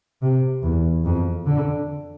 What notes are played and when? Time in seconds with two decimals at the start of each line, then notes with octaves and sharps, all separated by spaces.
0.22 C3
0.63 E2
1.05 F2
1.47 D3